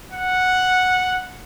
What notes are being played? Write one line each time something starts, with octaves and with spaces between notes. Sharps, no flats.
F#5